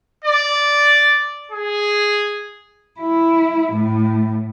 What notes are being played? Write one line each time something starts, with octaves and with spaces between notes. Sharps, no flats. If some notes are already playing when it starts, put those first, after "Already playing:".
D5
G#4
E4
A2